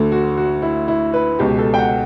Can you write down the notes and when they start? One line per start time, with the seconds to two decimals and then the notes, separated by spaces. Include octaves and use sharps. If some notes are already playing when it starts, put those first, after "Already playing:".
Already playing: D2 D3 A4
0.12 F#4
0.37 F#4
0.62 E4
0.88 E4
1.14 B4
1.39 C#2 B2 G4
1.59 A4
1.74 G5
1.78 F#5